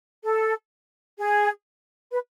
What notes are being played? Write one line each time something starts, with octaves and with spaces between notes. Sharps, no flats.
A4
G#4
B4